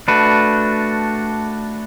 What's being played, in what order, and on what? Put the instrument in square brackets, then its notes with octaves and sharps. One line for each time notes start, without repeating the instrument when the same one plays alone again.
[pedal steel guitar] A3 D4 F#4 B4